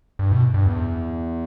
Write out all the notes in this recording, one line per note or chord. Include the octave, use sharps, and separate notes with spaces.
G2
B2
G2
E2